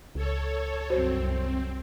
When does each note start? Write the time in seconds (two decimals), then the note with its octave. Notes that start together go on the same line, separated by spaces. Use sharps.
0.15 C#2 A4 C#5
0.90 C2 F#2 C4 F#4 C5 C#5